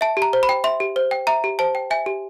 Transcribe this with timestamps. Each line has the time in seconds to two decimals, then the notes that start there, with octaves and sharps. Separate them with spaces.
0.01 E5 A5
0.17 G4
0.22 A#5
0.33 C5
0.43 B5
0.49 G5
0.64 E5 C6
0.80 G4
0.96 C5
1.11 G5
1.27 E5 A#5
1.44 G4
1.59 C5 A5
1.75 G5
1.91 E5 G#5
2.06 G4